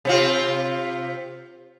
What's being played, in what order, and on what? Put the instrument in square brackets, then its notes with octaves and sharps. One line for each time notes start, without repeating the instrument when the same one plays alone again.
[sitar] C3 C4 F4